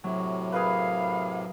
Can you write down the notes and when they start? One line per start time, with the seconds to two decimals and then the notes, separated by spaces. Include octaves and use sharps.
0.04 A2 C3 F#3
0.52 G#4 A#4 B4 F5